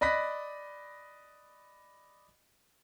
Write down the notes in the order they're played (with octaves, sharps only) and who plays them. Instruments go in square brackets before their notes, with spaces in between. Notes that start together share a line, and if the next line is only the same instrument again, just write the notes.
[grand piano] D5 D#5 B5 F#6 A#6 B6